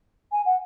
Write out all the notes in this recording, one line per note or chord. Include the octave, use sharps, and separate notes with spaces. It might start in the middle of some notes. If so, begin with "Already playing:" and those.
G#5
F#5